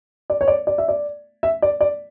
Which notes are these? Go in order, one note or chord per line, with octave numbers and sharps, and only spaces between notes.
D5
C#5
D5
D5
E5
D5
E5
D5
D5